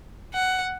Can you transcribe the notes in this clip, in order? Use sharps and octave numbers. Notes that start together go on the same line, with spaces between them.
F#5